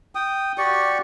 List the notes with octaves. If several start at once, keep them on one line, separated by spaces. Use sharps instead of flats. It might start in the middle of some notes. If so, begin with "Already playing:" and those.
G5 D#6
F#4 G4 D5 C#6